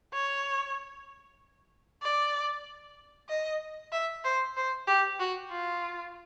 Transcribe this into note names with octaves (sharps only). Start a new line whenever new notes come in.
C#5
D5
D#5
E5
C5
C5
G4
F#4
F4